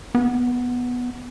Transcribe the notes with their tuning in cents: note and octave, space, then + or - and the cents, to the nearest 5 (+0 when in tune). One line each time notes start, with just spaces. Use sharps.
B3 -5